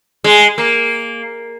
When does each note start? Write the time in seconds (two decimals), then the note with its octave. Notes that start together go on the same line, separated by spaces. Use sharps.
0.24 G#3
0.58 A#3